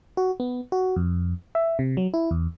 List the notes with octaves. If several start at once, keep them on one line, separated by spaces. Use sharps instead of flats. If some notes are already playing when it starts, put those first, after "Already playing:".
F#4
B3
F#4
F2
E5
C3
F#3
E4
E2